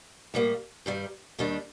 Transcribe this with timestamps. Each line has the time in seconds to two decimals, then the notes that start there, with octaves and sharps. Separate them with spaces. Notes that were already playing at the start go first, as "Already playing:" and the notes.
0.34 A2 G3 A#3
0.86 G2 D#3 G3
1.38 D#2 D#3 G3 D4